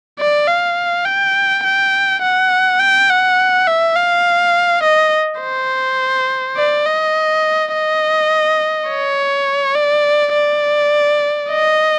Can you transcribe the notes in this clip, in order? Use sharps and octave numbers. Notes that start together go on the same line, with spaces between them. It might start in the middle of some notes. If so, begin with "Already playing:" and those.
D5
F5
G5
G5
F#5
G5
F#5
E5
F5
D#5
C5
D5
D#5
D#5
C#5
D5
D5
D#5